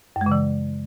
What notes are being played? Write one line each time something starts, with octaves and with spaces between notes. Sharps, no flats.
F#2
G#3
C#3
E3